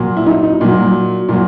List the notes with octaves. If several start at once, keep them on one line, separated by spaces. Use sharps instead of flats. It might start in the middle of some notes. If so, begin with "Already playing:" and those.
Already playing: A#2 F#3
E4
D#4
D#4
A#2 F#3
A#2 F#3